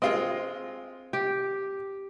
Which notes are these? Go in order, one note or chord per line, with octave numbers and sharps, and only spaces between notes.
G#3 C4 F4 D#5
G4